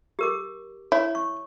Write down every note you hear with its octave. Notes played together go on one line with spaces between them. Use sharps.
G4 A#4 D6
E4 C#5
C#6